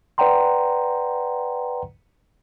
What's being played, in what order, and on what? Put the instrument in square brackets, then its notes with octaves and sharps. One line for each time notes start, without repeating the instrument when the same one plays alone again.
[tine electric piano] B4 D5 F#5 G5 A#5 C6